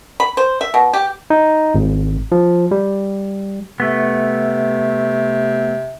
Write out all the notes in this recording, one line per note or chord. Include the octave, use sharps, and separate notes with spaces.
B5
C5
E5
B2
G4
D#4
G#1
F3
G3
C3 A3 B3